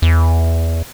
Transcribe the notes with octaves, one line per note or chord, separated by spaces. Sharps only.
E2